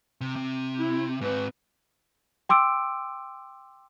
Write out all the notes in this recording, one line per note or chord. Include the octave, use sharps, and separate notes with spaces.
C3
C3
E4
G#2 C4 B4
G5 C6 D6 E6 D7